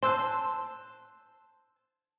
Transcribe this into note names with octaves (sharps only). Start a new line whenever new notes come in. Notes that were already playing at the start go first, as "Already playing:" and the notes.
C5 A5 C6 E6 F#6